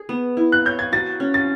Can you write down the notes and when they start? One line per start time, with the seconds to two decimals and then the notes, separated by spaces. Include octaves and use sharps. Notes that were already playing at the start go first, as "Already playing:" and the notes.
Already playing: G#4
0.09 B3
0.37 E4
0.52 F#6
0.65 C#5 G6
0.79 G#6
0.92 F#4 A6
1.20 C#4
1.34 A6